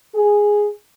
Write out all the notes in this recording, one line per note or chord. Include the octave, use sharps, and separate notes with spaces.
G#4